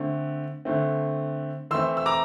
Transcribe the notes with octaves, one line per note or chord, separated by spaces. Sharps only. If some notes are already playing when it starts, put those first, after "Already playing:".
Already playing: D3 A3 C4
D3 A3 C4
E3 A3 C4 C6 E6
E6
A#5 D6